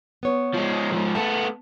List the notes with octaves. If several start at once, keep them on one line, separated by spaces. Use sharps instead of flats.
B3 C#5
F3 G#3
G#2 F3
A3 B3 A5